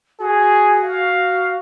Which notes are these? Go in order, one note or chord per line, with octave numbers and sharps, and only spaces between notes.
F#4 G#4
F5